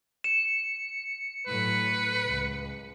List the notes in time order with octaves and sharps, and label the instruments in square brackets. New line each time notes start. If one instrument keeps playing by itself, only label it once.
[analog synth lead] C#7 [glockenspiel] E7
[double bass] A2 F#3 [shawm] B4
[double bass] C#2